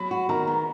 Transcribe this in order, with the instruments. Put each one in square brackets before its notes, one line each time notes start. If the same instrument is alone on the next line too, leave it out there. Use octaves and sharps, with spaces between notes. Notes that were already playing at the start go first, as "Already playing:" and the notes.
Already playing: [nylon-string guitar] F#3 [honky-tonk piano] B5
[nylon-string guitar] F#4
[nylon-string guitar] D#3 [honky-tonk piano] A#5
[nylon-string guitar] B3